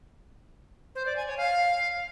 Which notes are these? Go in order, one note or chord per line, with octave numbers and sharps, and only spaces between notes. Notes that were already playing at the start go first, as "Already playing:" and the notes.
C5
D5
G#5
C#5
F5